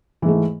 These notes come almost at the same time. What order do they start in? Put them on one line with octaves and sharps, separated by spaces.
E3 G#2 A3